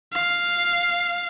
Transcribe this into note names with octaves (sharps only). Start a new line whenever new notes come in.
F5